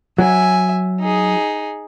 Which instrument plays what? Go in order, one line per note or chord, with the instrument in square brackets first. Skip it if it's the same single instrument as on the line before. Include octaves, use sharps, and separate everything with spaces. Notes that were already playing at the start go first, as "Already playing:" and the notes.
[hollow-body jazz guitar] F#3 [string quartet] E5 G#5
[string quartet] D#4 G#4